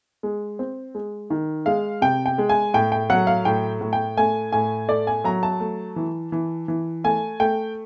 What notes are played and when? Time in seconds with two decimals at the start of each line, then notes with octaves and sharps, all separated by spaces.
0.23 G#3
0.59 C4
0.95 G#3
1.30 D#3
1.66 G#3 F5
2.02 C3 G5
2.26 G5
2.38 G#3
2.49 G#5
2.74 A2 G5
2.92 G5
3.10 F#3 F#5
3.27 F5
3.45 A2 G5
3.81 A2
3.93 G5
4.17 A3 G#5
4.52 A2 G#5
4.89 A3 D5
5.07 G#5
5.24 F#3 A#5
5.43 A5
5.60 A3
5.96 E3
6.32 E3
6.68 E3
7.04 A3 G#5
7.40 A3 G5